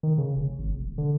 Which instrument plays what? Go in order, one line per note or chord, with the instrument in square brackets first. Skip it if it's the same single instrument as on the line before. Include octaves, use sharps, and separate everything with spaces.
[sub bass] D#3
C#3
F1
G#1
F1
E1
D3